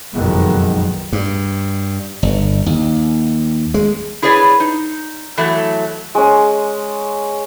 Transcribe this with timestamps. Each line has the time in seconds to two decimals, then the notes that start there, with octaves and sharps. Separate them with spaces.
0.15 F#1 B1 F2 D#3 G#3 B3
1.13 G2
2.23 G1
2.66 D#2
3.74 G#3
4.22 E4 G#4 B4 C#5 D5
4.60 D#4
5.37 E3 F#3 A3
6.15 G#3 C#4